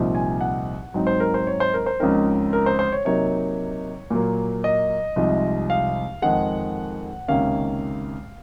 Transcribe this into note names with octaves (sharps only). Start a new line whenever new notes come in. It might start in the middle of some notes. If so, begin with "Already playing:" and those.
Already playing: C2 A#2 F3 C4 D#4
G#5
F#5
G#2 F#3 C4 D#4
C5
A#4
C5
C#5
C5
A#4
C5
C#2 C#3 F3 C4 D#4 A#4
A#4
C5
C5
C#5
C3 F#3 A#3 D#4 C#5
A#2 F#3 A#3
D#5
C2 C3 F3 G#3 D#4
F5
F2 D#3 G#3 F#5
C#2 C3 D#3 A#3 C#4 F5